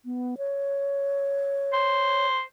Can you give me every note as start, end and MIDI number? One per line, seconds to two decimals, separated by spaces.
0.05 0.35 59
0.38 2.26 73
1.73 2.41 72